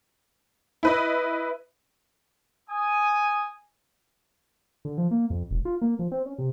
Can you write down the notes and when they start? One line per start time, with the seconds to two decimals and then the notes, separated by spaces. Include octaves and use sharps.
0.83 E4 B4 D#5
2.70 G#5 D#6
4.85 D3
4.98 F3
5.11 A#3
5.30 F2
5.51 E1
5.65 F4
5.82 A#3
5.99 F3
6.12 C4
6.26 C#4
6.38 C3